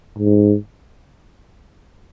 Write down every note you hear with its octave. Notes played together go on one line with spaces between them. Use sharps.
G#2